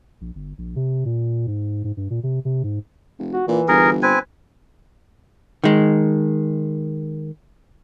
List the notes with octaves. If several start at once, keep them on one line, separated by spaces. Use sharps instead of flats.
A#1
G1
A#1
C3
A#2
G#2
G#2
G2
A#2
C3
C3
G#2
F1
F#4
A#2 E3
G1 G#4 A#4
C4 B4 G#5
D#3 G#3